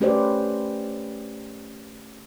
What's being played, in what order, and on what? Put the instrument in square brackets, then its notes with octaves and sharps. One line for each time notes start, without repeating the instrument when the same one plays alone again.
[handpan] A3 C#4 G4 B4 C5 D5